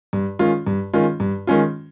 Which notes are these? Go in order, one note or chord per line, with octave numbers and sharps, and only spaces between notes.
G2
D#3 G#3 C#4 F4
G2
D#3 G#3 C#4 F4
G2
D#3 G#3 C#4 F4